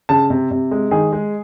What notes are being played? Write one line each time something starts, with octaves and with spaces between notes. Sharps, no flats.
C#3 A5
C3
C3
G#3
D#3 G#4
G#3